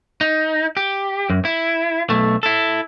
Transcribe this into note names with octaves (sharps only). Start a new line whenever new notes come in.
D#4
G4
F#2
E4
B1 A3
E4 A4